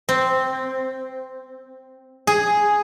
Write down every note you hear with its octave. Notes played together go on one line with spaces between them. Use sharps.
C4
G#4